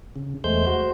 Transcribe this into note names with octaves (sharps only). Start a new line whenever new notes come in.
C#3
E2 G#3 A3 C5 G6
F#4 C5